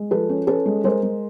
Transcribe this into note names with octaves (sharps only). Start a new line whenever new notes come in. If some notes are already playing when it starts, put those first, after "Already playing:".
Already playing: G#3
F3 A4 B4
C#4
C#4 A4 B4
G#3
G#3 A#4 C5
G#3